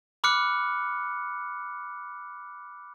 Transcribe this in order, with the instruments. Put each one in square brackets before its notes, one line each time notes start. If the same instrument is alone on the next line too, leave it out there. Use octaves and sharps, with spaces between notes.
[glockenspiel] B5 D6 F6 F#6 C#7